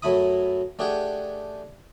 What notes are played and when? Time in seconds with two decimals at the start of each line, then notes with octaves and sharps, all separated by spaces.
0.02 F#2 F#3 A3 E4 B5 D#6
0.79 A3 D4 G4 G#4 F#5 G5